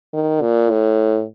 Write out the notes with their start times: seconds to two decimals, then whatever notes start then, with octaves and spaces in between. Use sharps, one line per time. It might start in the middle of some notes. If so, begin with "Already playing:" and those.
0.14 D#3
0.42 A#2
0.71 A2